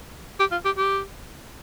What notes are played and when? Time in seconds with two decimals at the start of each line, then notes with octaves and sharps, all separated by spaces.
0.40 G4
0.52 F4
0.65 G4
0.78 G4